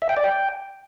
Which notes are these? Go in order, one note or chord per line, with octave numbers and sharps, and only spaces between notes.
E5
G5
D5
G5